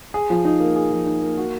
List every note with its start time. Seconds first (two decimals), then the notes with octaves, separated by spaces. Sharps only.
0.14 G#4
0.30 F3
0.45 D#4
0.60 A#3
0.76 G#4
0.91 F3
1.06 D#4
1.22 A#3
1.37 F#4